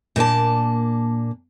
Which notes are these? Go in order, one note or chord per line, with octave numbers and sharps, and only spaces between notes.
A#2 A#3 D4 A5